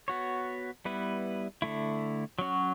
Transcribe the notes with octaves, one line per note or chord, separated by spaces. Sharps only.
B3 F#4 C#5
G3 B3 E4 B4
D3 A3 E4
F#3 C#4 F#4